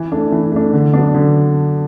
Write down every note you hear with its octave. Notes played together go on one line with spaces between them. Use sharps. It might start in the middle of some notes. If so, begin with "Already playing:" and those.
Already playing: E3
A3 D4
E3
A3 D4
D3
F#3 B3 D4
D3